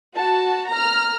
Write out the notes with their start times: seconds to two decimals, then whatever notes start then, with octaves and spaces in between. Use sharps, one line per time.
0.15 F#4 A5
0.70 A#5 F6